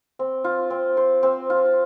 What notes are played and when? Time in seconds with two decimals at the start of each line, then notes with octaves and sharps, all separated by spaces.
0.19 C4
0.44 F4
0.70 C4
0.97 C5
1.23 C4
1.50 F4